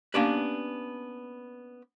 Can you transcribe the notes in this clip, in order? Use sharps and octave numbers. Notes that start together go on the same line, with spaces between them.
A#3 B3 C#4 D4 G4 B4